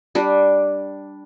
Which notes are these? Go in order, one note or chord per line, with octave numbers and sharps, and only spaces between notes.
G3 D4